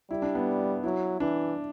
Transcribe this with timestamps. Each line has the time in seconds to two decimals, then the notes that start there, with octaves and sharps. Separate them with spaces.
0.10 G3 E4
0.22 D4
0.35 B3
0.84 F#3 E4
1.20 E3 D4